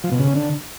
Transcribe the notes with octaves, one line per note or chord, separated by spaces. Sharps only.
F3
B2
C#3
C#4
D3